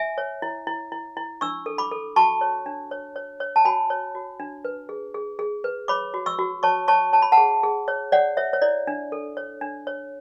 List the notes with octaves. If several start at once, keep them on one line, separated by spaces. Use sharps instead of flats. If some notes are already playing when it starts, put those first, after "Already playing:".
Already playing: E5 G#5
C#5
E4
E4
E4
E4
D4 C#6 E6
A4
B5 D6
A4
F#4 A5 C#6
C#5
D4
C#5
C#5
C#5
A5
F#4 G#5 B5
C#5
F#4
D4
B4
G#4
G#4
G#4
B4
C#5 B5 D6
F#4
C#6 E6
F#4
C#5 A5 C#6
C#5 A5 C#6
C#5 A5
B5
F#5 A5
G#4
G#4
C#5
C#5 D5 F#5
C#5 E5
C#5
E4 D5
D4
A4
C#5
D4
C#5